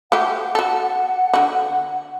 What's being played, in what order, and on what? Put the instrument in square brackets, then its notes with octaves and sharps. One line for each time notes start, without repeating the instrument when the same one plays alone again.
[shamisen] A3 F#4 G4 [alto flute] F#5
[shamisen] F#4 A4
D3 F#4